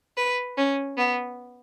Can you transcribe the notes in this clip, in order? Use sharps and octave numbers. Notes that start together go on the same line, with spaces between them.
B4
C#4
B3